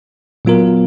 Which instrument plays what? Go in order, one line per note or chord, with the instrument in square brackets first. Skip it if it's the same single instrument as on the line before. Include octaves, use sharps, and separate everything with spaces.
[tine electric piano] A#2 F#3 B3 F4 A#4